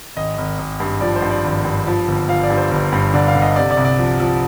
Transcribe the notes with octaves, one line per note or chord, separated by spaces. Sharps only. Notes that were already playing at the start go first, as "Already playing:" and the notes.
G#1 D#5
G#1
G#1
G2
F3 D5
C5
G2
D5
G#1
G2
F3
G1
F3 F5
D5
G2
C5
G1
G2
D3 D5
F5
D3
D#5
C3 D5
D5
C2
D5
F3
F3